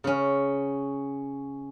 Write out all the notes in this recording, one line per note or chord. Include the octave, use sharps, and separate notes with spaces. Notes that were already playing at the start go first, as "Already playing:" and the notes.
C#3 C#4